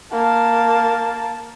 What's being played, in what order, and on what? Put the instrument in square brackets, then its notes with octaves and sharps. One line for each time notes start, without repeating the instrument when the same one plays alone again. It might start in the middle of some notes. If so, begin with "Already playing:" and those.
[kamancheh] A#3 A5